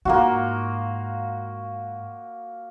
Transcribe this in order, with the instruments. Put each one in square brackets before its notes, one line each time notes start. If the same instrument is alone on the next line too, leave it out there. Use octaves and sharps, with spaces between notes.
[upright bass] G#2 [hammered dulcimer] A#3 F4 F#4